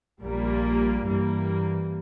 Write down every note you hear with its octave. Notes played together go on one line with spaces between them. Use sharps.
A#1 A#2 G3 A#3
G2 E3 G3 A#3